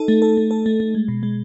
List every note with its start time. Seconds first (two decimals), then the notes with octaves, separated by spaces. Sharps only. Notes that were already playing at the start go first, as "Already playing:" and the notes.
Already playing: D#4 A4
0.08 A3
0.22 A4
0.37 A3
0.51 A4
0.66 A3
0.80 A3
0.95 G#3
1.08 B2
1.23 G#3